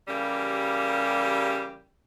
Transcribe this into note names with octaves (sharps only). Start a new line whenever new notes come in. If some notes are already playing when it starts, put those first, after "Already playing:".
C#3 E3 G3 A#3 G4